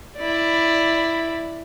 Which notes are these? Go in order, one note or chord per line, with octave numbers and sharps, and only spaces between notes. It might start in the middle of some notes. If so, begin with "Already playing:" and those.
E4 D5